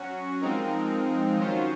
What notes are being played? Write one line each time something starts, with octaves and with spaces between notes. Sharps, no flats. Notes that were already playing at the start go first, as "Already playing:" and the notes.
Already playing: F#3 C#4 F#4
F3 G#3 C4 D#4 A#4
D#3 F#3 C#4 F4 C5